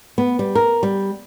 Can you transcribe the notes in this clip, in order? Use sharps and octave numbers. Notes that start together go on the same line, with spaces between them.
B3
G3
A#4
G3